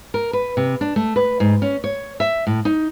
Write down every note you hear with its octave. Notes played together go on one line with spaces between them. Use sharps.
A#4
B4
C3
D4
A3
B4
G#2
C#4
C#5
E5
A2
D#4